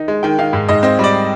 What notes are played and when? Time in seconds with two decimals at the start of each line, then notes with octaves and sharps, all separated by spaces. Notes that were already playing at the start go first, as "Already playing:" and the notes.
Already playing: D#3 D#4
0.08 G#3
0.23 D#3 G5
0.39 D#3 F5
0.53 G#2
0.69 G#2 D#5
0.83 C4 D#5
0.99 G3
1.04 D5